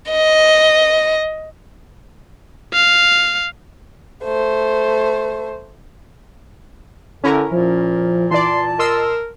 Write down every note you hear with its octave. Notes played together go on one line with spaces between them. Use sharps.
D#5
F5
A3 C5
D3 C#4 E4 A#4
A#2 F3
E3 D5 A5 C6
A#4 D#5 C6 E6